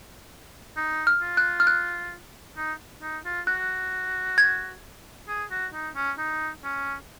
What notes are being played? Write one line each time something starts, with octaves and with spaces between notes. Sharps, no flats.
D#4
F6
F4
F#6
F6
F#6
D#4
D#4
F4
F#4 F#6
G#6
G#4
F#4
D#4
C#4
D#4
C#4